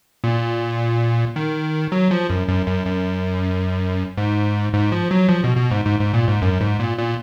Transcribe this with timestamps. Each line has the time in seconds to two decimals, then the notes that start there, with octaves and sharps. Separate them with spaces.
0.24 A#2
1.36 D#3
1.92 F#3
2.11 F3
2.30 F#2
2.48 F#2
2.66 F#2
2.86 F#2
4.17 G#2
4.74 G#2
4.92 F3
5.11 F#3
5.29 F3
5.44 B2
5.57 B2
5.71 G#2
5.85 G#2
6.00 G#2
6.13 A#2
6.28 G#2
6.42 F#2
6.61 G#2
6.80 A#2
6.98 A#2